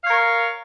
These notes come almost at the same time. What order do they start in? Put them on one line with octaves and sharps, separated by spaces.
F5 C#5 A#4